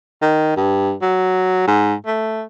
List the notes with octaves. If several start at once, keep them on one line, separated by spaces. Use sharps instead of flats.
D#3
G2
F#3
G#2
A3